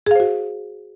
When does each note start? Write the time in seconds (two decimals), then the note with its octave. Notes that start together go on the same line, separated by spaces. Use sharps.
0.06 G#4
0.11 F5
0.15 C5
0.20 F#4